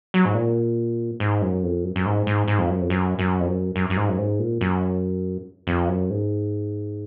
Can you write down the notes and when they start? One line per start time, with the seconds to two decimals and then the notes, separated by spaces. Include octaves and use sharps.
0.14 F#3
0.25 G#2
0.34 A#2
1.20 G#2
1.41 F#2
1.63 F2
1.84 F#2
1.96 F#2
2.06 G#2
2.27 G#2
2.48 G#2
2.59 F2
2.69 F#2
2.81 F2
2.90 F#2
3.19 F#2
3.40 F2
3.48 F#2
3.76 F#2
3.90 F#2
3.97 G#2
4.09 F#2
4.18 G#2
4.39 A#2
4.61 F#2
5.67 F2
5.88 F#2
6.10 G#2